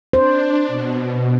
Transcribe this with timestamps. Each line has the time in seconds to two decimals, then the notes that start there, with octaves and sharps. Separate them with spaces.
0.13 D4 C5
0.68 B2